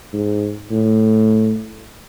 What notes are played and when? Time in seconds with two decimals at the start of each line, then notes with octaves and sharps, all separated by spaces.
0.13 G#2
0.71 A2